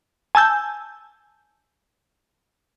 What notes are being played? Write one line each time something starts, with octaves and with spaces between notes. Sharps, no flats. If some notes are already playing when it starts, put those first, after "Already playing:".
G#5 A5 E6 G6